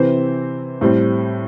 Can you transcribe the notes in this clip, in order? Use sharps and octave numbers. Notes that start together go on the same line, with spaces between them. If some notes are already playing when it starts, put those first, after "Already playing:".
Already playing: C3 E3 C4 C5
A2 G3 C4